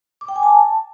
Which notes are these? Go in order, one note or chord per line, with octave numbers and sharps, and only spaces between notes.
D6
G5
G#5
A5